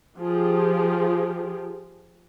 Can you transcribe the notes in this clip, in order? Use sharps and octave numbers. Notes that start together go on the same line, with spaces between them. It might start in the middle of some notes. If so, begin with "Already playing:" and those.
F3 F4 G4 G#4